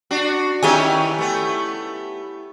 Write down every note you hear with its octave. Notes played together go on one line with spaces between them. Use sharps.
D4 F#4
D#3 B3 C#4 E4 G4 G#5
A3 B3